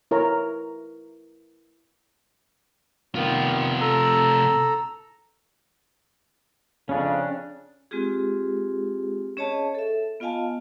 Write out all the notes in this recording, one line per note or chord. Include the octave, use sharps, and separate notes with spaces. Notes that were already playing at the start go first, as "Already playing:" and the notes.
E4 A#4 C#5 A#5
C3 D#3 B3 F4
A4 A#5 E6
F2 C#3 C#4 D4
G#3 C4 F4 G4 G#4
C#4 G#4 C#5 D#5 A5
A4 E5
B3 F4 D#5 F5 G#5 A5